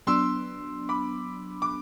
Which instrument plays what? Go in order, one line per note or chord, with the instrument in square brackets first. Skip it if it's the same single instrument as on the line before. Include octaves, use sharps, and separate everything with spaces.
[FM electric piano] F#3 B3 D4 [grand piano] C6 E6
[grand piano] B5 D6
D6